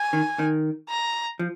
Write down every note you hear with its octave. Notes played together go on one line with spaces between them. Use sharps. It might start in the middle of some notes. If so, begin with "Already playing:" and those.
Already playing: G#5
D#3
D#3
A#5
F3